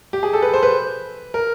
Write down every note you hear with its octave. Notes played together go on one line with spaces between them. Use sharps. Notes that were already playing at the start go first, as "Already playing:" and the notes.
G4
G#4
A4
B4
C5
B4
A#4